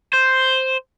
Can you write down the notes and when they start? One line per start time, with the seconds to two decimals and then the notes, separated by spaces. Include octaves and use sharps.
0.14 C5